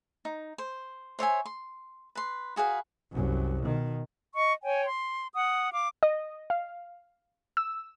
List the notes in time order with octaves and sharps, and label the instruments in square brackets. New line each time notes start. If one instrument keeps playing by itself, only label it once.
[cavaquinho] D#4
C5
C5 C#5 E5 G#5
C6
B4 C6
F#4 G#4 B4 F5
[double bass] C2 F#2
B2 D#3
[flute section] D#5 C#6
C#5 G5 G#5
C6
F#5 D#6
F5 D6
[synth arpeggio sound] D#5
F5
E6